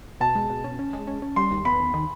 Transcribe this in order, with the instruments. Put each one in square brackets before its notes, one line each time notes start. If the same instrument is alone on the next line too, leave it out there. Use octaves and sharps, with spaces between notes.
[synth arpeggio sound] B2 [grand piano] A5
[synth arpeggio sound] G#3
B2
C#4
C#4
G#3
C#4
C#4
[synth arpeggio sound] G3 [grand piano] C6
[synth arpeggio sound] D#2
[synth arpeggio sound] B3 [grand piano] B5
[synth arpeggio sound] D#2
D#3